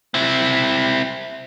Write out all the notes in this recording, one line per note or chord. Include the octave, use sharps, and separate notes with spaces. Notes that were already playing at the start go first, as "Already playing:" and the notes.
C4 E4